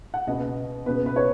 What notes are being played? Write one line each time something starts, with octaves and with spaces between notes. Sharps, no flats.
F#5
C#2 B2 B3 D#5
C#2 B2 B3 B4
B4
C#5